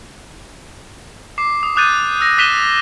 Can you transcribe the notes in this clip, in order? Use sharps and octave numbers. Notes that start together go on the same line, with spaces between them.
D6 C7
D#6
D6 D#6 F#6 G6 A6 D#7
E6 A#6
D#6 F#6 B6 D#7 E7 G7